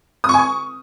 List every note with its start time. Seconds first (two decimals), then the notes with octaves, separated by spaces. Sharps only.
0.24 D#6
0.29 C#6
0.34 G#5
0.39 C#6